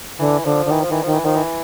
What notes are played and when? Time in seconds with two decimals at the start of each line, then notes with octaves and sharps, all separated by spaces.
0.19 D3 E3
0.45 D3 F3
0.65 D3
0.71 D#3 E3
0.82 F3
0.89 D#3 E3
1.03 D#3 F3
1.14 E3
1.23 D#3 F3
1.36 E3